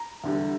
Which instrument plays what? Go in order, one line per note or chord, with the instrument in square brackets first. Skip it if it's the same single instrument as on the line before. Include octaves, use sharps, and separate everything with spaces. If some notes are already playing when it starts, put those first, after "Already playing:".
Already playing: [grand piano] A#5
[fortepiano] E2 D3 G3